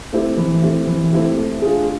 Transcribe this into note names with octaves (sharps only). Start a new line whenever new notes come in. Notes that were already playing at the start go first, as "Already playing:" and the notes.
A3 C4 E4 G4
E3
A3 C4 E4 G4
E3
A3 C4 E4 G4
A3
D4 F4 G#4